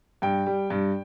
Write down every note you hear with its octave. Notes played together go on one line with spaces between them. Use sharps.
G2 G5
G3
G2